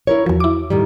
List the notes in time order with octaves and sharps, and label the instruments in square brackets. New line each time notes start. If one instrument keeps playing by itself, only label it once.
[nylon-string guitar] E4 A#4 C#5
[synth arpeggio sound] E2 F3 [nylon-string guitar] F#4
[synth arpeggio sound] E4 D6
[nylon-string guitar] A2 D#3 G3